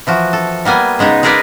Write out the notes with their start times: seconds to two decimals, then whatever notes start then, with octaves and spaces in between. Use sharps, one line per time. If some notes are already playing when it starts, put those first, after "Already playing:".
0.07 E3 F3 F#4
0.33 A4
0.65 G3 A#3 B3 G#5
0.99 C#3 G#3 B3 D#4
1.23 G#3 G#4 A#4 B4 D5 D#5